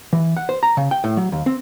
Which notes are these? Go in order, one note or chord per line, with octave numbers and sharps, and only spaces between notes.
E3
F#5
C5
A#5
C#3
G5
A2
F#3
D#2
C4